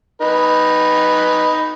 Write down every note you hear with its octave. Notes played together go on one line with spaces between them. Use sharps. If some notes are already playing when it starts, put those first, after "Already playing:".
D#4 B4